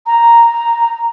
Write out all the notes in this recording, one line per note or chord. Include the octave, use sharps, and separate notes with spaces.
A#5